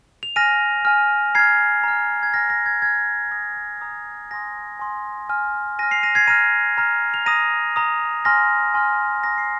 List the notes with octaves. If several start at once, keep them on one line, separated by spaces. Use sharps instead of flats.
F7
G#5 F6 A#6 D#7
G#5 F6
A#5 F6 G#6 C7
A#5 F6
G#6
G#5 F6 A#6
A#6
G#6
G#5 F6 G#6
A#5 D#6 A#6
A#5 D#6
G#5 C6 D#6 A#6
G#5 C6 D#6
G#5 F6
G#5 F6 A#6 D#7
C7 F7
A#6 D#7
G#6 C7
A#5 F6 A#6 D#7
A#5 F6
F7
A#5 D#6 A#6 D#7
A#5 D#6
G#5 C6 F6 A#6
G#5 C6 F6
A#5 D#6 A#6
C7